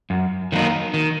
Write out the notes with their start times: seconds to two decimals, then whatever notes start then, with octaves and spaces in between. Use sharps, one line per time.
0.10 F#2
0.52 D#3 F#3 A#3 D#4
0.94 D#3